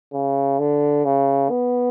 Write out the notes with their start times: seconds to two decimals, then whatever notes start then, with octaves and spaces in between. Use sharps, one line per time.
0.13 C#3
0.59 D3
1.05 C#3
1.50 B3